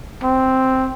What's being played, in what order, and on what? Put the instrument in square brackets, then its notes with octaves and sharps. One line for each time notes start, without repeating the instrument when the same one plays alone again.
[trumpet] C4